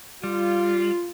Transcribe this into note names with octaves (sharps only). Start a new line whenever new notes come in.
G3 F4